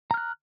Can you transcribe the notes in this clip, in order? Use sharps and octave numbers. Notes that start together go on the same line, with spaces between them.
A#5 F6 F#6